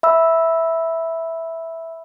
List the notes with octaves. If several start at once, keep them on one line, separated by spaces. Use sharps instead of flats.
E5 B5 E6